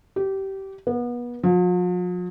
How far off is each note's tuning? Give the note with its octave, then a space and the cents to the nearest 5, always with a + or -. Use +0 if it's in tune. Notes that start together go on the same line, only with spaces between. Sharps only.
G4 -20
B3 -30
F3 +45